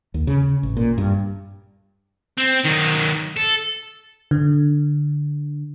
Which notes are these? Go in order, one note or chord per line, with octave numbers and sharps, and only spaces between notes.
D#2
C#3
A1
A#2
G2
C4
D#3 F#3
A4
D3